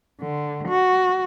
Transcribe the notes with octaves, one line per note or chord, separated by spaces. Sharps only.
D3
F#4